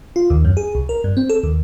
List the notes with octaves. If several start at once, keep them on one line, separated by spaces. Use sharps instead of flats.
F4
D#2
F#2
G#4
C2
A#4
G2
C4
A4
D#2